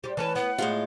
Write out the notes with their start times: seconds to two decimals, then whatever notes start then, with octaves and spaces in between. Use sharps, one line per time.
0.04 G3 G4 C5
0.17 E3 C#4 B4 A5
0.35 B3 F#5
0.58 A2 G#3 F4 F5